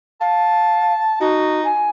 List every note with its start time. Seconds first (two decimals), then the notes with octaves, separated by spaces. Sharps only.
0.21 F5 A5
1.20 D#4 F#4
1.65 G#5